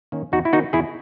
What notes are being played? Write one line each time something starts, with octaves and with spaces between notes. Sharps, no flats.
D#3 A#3 C#4
E2 D#4 F#4
E4
D#3 A#3 D#4 F#4
E2 E4 G#4